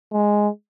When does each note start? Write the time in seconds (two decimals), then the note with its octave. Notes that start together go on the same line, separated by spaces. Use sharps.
0.13 G#3